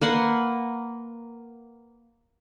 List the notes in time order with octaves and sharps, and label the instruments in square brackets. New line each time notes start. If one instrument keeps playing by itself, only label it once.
[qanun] A#3 B4 F#5 C6